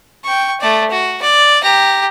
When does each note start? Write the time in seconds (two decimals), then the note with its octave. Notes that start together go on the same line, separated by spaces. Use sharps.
0.24 G5 C#6
0.61 A3 D5
0.90 F#4
1.22 D5
1.63 G4 A#5